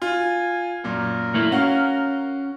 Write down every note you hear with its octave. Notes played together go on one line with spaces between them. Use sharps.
F4 G#5
F#2 A#2 A#4
A3 A#3 E4
C#4 F#4 F5